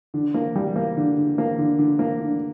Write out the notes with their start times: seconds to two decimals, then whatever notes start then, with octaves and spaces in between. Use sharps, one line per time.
0.14 D3
0.34 A#3
0.56 G3
0.76 A#3
0.97 D3
1.17 D3
1.38 A#3
1.58 D3
1.79 D3
1.99 A#3
2.21 D3